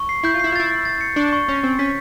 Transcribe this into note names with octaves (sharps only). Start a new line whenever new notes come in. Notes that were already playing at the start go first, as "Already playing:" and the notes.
Already playing: C#6
C7
E4 G6
F4
E4 C7
F4
E4 A6
A6
A6
C#7
D4 C#6
C#6
C#4 C#6
C4 A6
C#4 B6